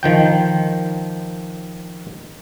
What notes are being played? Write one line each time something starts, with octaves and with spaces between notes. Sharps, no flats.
D#3 F3 G5